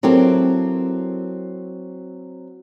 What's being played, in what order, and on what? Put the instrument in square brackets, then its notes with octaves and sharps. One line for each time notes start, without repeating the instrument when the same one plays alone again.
[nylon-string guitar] F#3 C4 E4 G4 A4 A#4